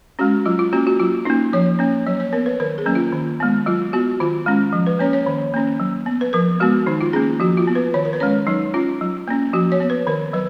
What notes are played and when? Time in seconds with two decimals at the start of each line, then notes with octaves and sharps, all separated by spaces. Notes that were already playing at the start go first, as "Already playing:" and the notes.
0.19 G#3 C#4 F#4
0.46 F#3 F4
0.59 F4
0.73 A#3 C#4 F#4
0.87 F#4
1.00 F#3 F4
1.25 A#3 C#4 D#4
1.53 F3 C#5
1.79 A#3 C#4
2.06 F#3 C#5
2.20 C#5
2.33 B3 A#4
2.46 B4
2.60 D#3 A#4
2.78 G#4
2.86 F#3 A#3 C#4
2.95 F4
3.12 D#3
3.40 G#3 B3
3.66 F#3 F4
3.93 B3 F#4
4.20 D#3 F4
4.46 G#3 C#4
4.73 F3
4.86 B4
4.99 A#3 C#4 C#5
5.13 C#5
5.26 D#3
5.54 A#3 C#4
5.80 F#3
6.06 B3
6.21 B4
6.33 F3 A#4
6.60 G#3 B3 F#4
6.86 D#3 D#4
7.01 F4
7.13 A#3 C#4 G#4
7.40 F3 F#4
7.57 F4
7.67 B3
7.75 B4
7.94 D#3 C#5
8.05 A#4
8.13 B4
8.20 G#3 C#4 C#5
8.47 F#3 D#4
8.74 C#4 F4
9.01 F#3
9.28 A#3 C#4
9.53 F3 F#4
9.72 C#5
9.80 B3
9.90 B4
10.07 D#3 A#4
10.33 F#3 B4